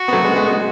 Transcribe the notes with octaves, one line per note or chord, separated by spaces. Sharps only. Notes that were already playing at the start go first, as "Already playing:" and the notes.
Already playing: F#4
B3
F#3 A3
G#3 B3
G#3 B3
G#3 B3